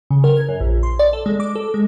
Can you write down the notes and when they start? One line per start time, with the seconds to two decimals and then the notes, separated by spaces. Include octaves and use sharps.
0.10 C#3
0.24 A#4
0.37 G#6
0.49 F#2
0.60 A#1
0.83 C6
0.99 D5
1.13 A4
1.26 G#3
1.40 D6
1.55 A4
1.74 G#3